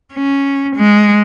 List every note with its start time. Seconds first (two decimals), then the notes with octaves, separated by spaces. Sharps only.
0.14 C#4
0.76 G#3